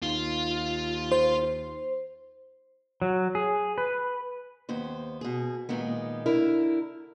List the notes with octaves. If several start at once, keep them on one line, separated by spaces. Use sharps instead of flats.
D#2 F4
C5
F#3
G#4
B4
D#2 B3 C5
B2 G#4
A#2 D#3 G#3 B3
D3 E4 A#4